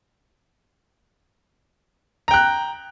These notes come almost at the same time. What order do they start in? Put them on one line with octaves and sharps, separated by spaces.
A#5 G5 F#6